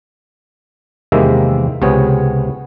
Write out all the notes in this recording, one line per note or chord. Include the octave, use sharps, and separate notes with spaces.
E2 C3 D#3 G#3 A#3 E5
C#2 C3 B3 G#4 C#5